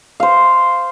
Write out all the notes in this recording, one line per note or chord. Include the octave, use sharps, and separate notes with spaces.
C5 F5